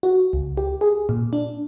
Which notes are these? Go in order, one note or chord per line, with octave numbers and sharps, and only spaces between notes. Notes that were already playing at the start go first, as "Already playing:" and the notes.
F#4
C#2
G4
G#4
A#2
D4